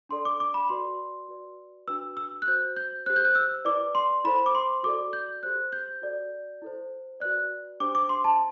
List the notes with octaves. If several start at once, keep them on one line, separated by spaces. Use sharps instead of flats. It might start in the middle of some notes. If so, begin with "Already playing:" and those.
D4 A4 D5 C6
D6
D6
B5
F#4 B4 D5 C6
F#4 B4 D5
D4 F#4 B4 E6
E6
F#6
F#4 C5 G6
G6
G4 C5 F#6
G6
F#6
E6
E4 B4 D5 D6
C6
E4 A4 C5 B5
D6
C6
F#4 A4 D5 D6
G6
G4 C5 F#6
G6
F#4 A4 D5
E4 A4 C5
F#4 B4 D5 F#6
D4 G4 C5 D6
D6
C6
A5